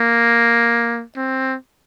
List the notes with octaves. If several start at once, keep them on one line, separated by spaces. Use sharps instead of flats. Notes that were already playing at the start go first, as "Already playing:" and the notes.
Already playing: A#3
C4